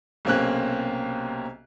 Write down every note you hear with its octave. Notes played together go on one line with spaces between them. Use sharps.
B1 C3 A#3 C4 C#4 F#6